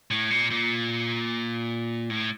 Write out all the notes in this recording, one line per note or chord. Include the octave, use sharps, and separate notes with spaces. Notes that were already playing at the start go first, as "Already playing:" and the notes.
A2
A#2
A#2
A2